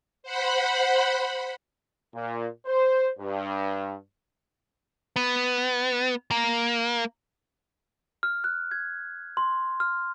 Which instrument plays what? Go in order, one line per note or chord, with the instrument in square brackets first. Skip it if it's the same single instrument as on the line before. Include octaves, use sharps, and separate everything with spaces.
[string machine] C5 F#5 B5
[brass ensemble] A#2
C5
G2
[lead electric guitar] B3
A#3
[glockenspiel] F6
F#6
G#6
C6
F6